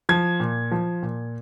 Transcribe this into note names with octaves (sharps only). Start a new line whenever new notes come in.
F3 G#6
A#2
F3
A#2